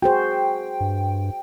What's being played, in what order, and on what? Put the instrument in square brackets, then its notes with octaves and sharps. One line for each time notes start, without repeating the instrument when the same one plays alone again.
[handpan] F#4 G#4 C5 [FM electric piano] G5
[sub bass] G2